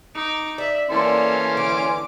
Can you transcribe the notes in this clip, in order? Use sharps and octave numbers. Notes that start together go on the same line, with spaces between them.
D#4 D6
D5 E5
E3 A#3 C#4 A4 C6
D3 D6